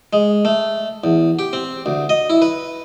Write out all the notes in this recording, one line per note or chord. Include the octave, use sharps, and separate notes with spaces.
G#3
A3
E2
G4
C4
D2
D#5
E4
B4